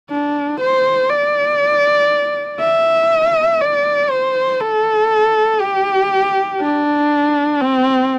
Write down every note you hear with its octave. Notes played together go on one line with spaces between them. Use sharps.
D4
C5
D5
E5
D5
C5
A4
G4
D4
C4